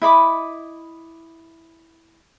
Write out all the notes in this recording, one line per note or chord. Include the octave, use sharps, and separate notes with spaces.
E4 D#5 B5 D6